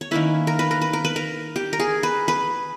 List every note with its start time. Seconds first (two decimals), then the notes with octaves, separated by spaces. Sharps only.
0.01 C#5
0.11 D#3 A#3 C#4 E4 B4
0.47 A#4
0.59 B4
0.71 A#4
0.81 B4
0.93 A#4
1.05 B4
1.16 A#4
1.56 G4
1.73 A#4
1.80 G#4
2.03 B4
2.28 B4